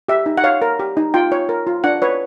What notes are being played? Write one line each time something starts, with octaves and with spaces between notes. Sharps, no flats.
G4 E5
D#4
F#5
C#5 F5
A#4
G4
D#4
F4 G5
C#5
A#4
F4
D4 F#5
B4 C#5